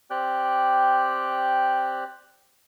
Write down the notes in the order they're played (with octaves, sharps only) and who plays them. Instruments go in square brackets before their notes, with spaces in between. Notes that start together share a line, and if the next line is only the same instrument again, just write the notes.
[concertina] C4 G4 D5 G5 F#6